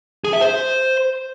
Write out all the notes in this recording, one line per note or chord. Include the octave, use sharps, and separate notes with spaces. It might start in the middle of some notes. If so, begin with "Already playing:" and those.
G#4
E5
C5